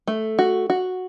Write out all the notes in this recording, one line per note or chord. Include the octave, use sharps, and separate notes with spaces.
A3
F#4
F#4